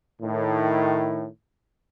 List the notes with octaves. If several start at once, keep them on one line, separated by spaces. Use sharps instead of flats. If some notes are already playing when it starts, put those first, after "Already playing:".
A2 D#3